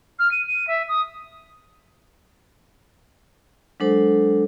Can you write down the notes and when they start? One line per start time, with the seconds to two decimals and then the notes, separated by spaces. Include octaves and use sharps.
0.19 F6
0.31 D#7
0.47 D#7
0.67 E5
0.89 D#6
3.80 F#3 G#3 D4 A4 C5